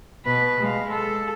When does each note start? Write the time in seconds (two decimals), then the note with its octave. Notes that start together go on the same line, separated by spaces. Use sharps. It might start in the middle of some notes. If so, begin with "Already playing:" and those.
0.25 B2 B4
0.60 G#3 F5
0.91 A4